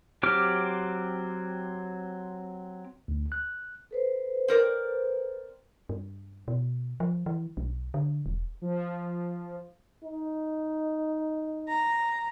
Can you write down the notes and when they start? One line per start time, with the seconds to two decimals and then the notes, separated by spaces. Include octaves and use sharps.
0.23 F#3 C4 G4 D6 F6
3.08 D2
3.32 F#6
3.91 A4 B4 C5
4.48 C4 A#4 D5
5.89 G2
6.48 B2
7.00 F3
7.26 E3
7.57 B1
7.94 D3
8.26 E1
8.62 F3
10.04 D#4
11.69 A#5